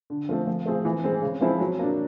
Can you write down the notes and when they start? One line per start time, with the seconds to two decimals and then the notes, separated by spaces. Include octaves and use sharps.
0.10 D3
0.29 F3 A3 C4
0.47 F3
0.66 A3 C4 F4 G#4
0.85 E3
1.04 G#3 C4
1.22 C#3
1.41 F3 G#3 C4 E4
1.60 F#3
1.79 A#3 D4